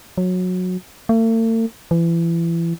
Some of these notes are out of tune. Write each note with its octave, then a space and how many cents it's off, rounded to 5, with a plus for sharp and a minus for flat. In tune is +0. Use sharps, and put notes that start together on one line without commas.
F#3 -20
A3 +45
E3 +30